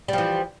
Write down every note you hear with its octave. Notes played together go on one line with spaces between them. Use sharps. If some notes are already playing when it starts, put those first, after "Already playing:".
E3 F3 G3